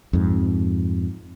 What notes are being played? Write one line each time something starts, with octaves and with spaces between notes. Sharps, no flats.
F2 G#2